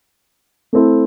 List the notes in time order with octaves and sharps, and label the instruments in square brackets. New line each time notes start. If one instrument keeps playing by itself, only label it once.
[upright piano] A3 C4 E4 A4